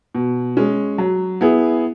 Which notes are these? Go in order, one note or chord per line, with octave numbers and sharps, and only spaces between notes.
B2
G#3 C#4
F#3
B3 E4 G#4